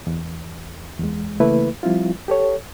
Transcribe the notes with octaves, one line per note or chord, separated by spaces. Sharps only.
E2
E2 G#3
C#3 E3 A3 A#3 E4 B4
F3 G3 C4 E4 F4
G4 A4 C#5